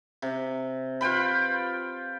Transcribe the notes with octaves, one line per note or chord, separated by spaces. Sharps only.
C3
F4 B4 G5 B5